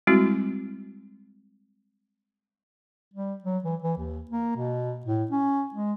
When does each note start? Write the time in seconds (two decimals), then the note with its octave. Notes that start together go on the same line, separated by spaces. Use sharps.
0.07 G3 G#3 C4 E4 F#4
3.14 G3
3.43 F#3
3.64 E3
3.82 E3
3.98 D#2
4.31 A#3
4.57 B2
5.06 A2
5.31 C#4
5.74 G#3